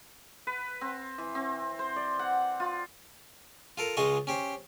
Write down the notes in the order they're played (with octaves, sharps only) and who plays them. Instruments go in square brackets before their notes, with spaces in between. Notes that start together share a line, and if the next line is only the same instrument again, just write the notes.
[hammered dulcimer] B4
C4
E3
C4
C5
D5
F#5
F4
[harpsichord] F4 A4 A#4
C#2 G#3 F4 D#5 C#6
C#4 G4 C5